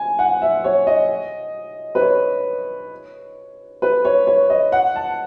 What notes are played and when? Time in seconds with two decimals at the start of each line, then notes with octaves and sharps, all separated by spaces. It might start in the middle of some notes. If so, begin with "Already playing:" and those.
Already playing: G#5
0.19 F#5
0.42 E5
0.64 C#5
0.87 D#5
1.95 B4
2.01 C#5
3.82 B4
4.05 C#5
4.27 C#5
4.50 D#5
4.72 F#5
4.96 A5